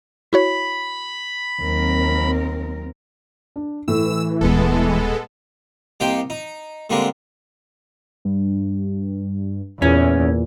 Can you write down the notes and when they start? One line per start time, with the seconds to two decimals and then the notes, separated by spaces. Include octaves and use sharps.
0.33 E4 F#4 C#5 B5
1.62 D#2 F#3 C4 A#4
3.56 D4
3.88 A2 E3 E6
4.41 D#1 B2 G#3 B3 A4
6.00 C2 A#3 D#4 G4 G5 C6
6.30 D#4
6.90 D3 G3 G#3 A#3 C4 D4
8.25 G2
9.82 E2 A#2 C#4